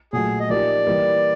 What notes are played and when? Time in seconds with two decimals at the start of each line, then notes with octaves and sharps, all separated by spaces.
0.13 A#2 F#3 A3 G#4
0.40 D#5
0.49 F3 A#3 D#4 G4 D5
0.87 E3 G3 A#3